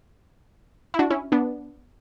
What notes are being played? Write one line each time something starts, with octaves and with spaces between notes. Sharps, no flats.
E4
D4 F#4
C#4 E4
B3 D4